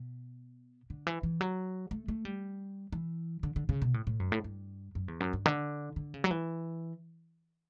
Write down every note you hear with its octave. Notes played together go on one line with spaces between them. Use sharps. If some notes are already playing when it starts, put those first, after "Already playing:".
Already playing: B2
D3
E3
E3
F#3
A3
A3
G3
E3
D3
D3
C#3
B2
A2
A2
F#2
A2
G2
F#2
E2
F#2
G2
D3
D3
C#3
F#3
E3